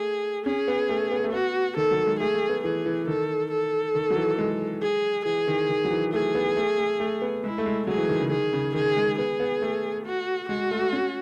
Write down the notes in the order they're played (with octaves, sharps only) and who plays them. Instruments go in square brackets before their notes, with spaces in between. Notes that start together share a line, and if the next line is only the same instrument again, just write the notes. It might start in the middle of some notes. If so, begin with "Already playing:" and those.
Already playing: [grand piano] A3 [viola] G#4
[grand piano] C#4 [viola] G#4
[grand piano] B3
A3
B3
A3
[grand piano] B3 [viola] F#4
[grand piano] D#3 [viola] A4
[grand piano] F#3
G#3
[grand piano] A3 [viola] G#4
[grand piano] A3
B3
[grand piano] E3 [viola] G#4
[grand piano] E3
[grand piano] D#3 [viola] A4
[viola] A4
[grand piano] D#3
F#3
E3
G#3
[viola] G#4
[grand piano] E3 [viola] G#4
[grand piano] D#3
D#3
F#3
E3
[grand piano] A3 [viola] G#4
[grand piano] B3
A3
A3
A3
B3
[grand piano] G#3 [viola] E4
[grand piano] A3
G#3
[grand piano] F#3 [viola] G#4
[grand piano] E3
D#3
C#3
[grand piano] D#3 [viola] G#4
[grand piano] C#3
[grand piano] D#3 [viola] G#4
[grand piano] G#3
[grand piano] B3 [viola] G#4
[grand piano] B3
A3
[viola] F#4
[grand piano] G#3 [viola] F#4
[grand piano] A3
C#4